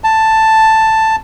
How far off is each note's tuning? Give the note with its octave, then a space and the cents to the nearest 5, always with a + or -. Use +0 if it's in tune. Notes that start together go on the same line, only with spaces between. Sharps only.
A5 +5